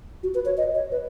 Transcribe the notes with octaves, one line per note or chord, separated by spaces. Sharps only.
F#4
B4
C#5
D#5
C#5
B4